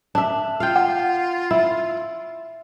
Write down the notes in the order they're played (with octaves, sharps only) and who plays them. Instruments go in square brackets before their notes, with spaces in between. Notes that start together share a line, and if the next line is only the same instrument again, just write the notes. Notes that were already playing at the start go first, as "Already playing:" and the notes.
[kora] D4 E5
[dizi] F4 [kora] F5 G5
[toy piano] F#5
[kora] E4